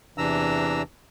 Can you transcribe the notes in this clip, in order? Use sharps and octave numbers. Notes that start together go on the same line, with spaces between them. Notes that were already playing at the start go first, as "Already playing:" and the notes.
E2 C3 E3 D4 A#5 E6